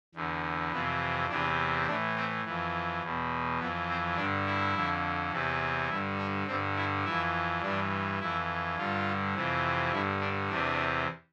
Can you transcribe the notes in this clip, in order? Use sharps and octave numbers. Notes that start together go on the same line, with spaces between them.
E2 D3
F2 C3 E3 B3
E2 C3 E3 D4
A2 E3 D4
C4
F2 E3
E2 B2
F2 E3 B3
C4
G2 D3 D4
E4
F2 D3
E2 C3 E3
G2 D3 E4
D4
G2 D3 C4
E4
F2 E3 E4
G2 E3 D4
F2 E3 E4
G2 D3 F4
F2 C3 E3
G2 D3 E4
D4
E2 C3 E3 D4